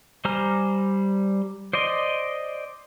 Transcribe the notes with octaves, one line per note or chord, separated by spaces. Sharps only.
G3 C5 G#5 A#5 F6
C5 D5 D#5 C6